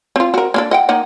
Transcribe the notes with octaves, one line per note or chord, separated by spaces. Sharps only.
C4 F4
F#4 A#4
A#3 D4 A4
D#5 F#5 G5
A#3 D#4 F#5